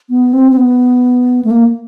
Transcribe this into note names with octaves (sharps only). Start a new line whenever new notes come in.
B3
C4
C4
B3
A3
A#3